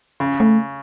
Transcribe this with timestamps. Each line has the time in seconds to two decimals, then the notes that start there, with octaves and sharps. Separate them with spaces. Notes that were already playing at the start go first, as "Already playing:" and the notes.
0.20 C#3
0.40 A3